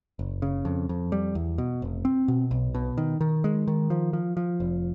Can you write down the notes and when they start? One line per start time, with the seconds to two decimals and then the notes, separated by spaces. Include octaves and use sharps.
0.19 F#1
0.42 C#3
0.65 F2
0.89 F2
1.12 G3
1.35 E2
1.58 B2
1.82 F1
2.05 C4
2.28 B2
2.51 B1
2.75 B2
2.98 D#3
3.21 D#3
3.44 G#3
3.67 D#3
3.90 F3
4.13 F3
4.37 F3
4.60 F1